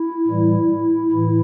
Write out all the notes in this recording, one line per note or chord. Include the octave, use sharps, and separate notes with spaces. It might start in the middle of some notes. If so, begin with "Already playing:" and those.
Already playing: E4
A2 E3 G3
A2 E3 E4